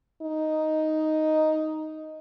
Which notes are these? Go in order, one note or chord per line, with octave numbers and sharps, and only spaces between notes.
D#4